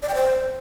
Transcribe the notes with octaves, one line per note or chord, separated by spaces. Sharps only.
D5
G5
C5